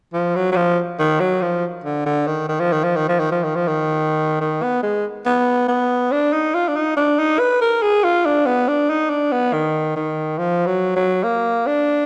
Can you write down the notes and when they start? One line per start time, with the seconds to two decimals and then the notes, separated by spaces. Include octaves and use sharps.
0.13 F3
0.36 F#3
0.52 F#3
0.56 F3
0.99 D#3
1.20 F#3
1.42 F3
1.84 D3
2.06 D3
2.27 D#3
2.49 D#3
2.60 F3
2.72 D#3
2.84 F3
2.96 D#3
3.09 F3
3.20 D#3
3.32 F3
3.44 D#3
3.56 F3
3.68 D#3
4.41 D#3
4.63 B3
4.83 G#3
5.26 B3
5.69 B3
6.12 D4
6.33 D#4
6.55 F4
6.68 D4
6.76 D#4
6.97 D4
7.19 D#4
7.39 B4
7.61 A#4
7.83 G#4
8.04 F4
8.26 D4
8.46 B3
8.68 D4
8.90 D#4
9.10 D4
9.32 B3
9.53 D#3
9.96 D#3
10.38 F3
10.67 F#3
10.96 F#3
11.24 A#3
11.67 D4